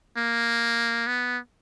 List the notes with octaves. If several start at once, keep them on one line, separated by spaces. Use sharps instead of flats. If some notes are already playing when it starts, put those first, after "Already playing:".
A#3
B3